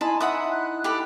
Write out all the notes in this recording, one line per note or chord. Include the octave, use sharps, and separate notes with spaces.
D#4 E4 G#5 A5 B5 C6
E5 F#5 B5 D#6
F#6
G4 A4 B5